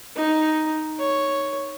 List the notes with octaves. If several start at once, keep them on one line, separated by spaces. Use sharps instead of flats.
D#4
C#5